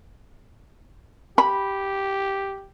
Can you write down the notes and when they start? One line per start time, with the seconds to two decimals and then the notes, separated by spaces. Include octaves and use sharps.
1.38 G4 B5